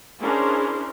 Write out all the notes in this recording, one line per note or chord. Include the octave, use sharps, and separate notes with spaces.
C#4 D4 E4 G#4 A#4 C5